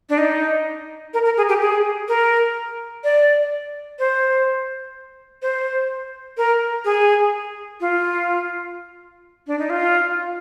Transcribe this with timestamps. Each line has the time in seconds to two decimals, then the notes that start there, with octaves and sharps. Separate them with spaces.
0.09 D4
0.18 D#4
1.14 A#4
1.25 A#4
1.37 G#4
1.49 G4
1.61 G#4
2.08 A#4
3.04 D5
3.99 C5
5.42 C5
6.37 A#4
6.85 G#4
7.81 F4
9.47 D4
9.59 D#4
9.70 F4